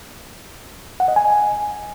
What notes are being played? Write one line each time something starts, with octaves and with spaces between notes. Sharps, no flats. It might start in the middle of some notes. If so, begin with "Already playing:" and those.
F#5
D#5
G#5